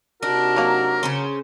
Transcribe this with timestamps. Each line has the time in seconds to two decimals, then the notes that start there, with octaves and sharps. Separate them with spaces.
0.23 C3 D4 D#4 F#4 A#4
0.56 F#3 A#3
1.03 C#3 C#4 C5